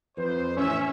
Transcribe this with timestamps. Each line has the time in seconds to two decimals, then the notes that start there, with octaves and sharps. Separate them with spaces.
0.17 F2 B4 C5
0.57 A1 C#4 E5